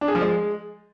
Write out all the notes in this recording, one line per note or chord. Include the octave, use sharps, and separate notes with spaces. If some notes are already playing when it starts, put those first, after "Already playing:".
D4
G#4
F3
G#3